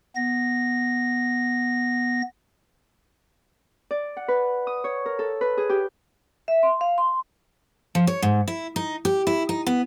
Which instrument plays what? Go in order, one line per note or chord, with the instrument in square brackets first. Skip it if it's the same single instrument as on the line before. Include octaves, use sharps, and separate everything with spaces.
[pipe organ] B3 A#6
[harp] D5
F#5
B4
D#6
C#5
A#4
A4
B4
G#4
G4
[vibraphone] E5
C6
F5
C6
[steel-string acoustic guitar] F3
C#5
G#2
E4
D#4
G4
E4
D#4
B3